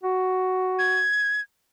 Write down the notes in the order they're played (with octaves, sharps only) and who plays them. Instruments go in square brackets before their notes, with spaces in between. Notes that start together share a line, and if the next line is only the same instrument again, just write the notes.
[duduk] F#4
[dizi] G#6